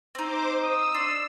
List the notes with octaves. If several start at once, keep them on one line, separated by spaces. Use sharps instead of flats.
C4 D#4 C5 D6
D#6 E6
D4 C6